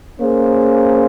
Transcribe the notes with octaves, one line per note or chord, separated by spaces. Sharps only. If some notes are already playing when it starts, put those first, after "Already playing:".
A#3 C#4 G#4 C5